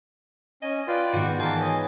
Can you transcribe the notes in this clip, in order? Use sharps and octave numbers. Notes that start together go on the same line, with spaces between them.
C#4 D#5 G#5
F4 B4 C5 D5 F#5 G5
G#2 D#3 B3 F#4
E3 A#4 G5 A5 C6
C#5 D#5 G#5 D#6 E7